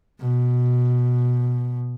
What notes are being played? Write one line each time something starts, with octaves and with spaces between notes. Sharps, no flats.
B2